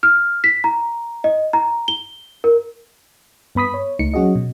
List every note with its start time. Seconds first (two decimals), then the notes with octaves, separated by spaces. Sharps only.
0.03 F6
0.44 B6
0.64 A#5
1.24 D#5
1.53 A#5
1.88 G7
2.44 A#4
3.55 G2 B3 B5 D#6 B6
3.74 C#5
3.99 C#2 A3 D#4 C#7
4.14 F#3 C#4 F#4 G#4 D#5
4.35 B2